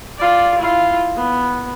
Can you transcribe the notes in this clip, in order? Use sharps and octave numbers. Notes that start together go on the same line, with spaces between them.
F4 D5
E4 F4
B3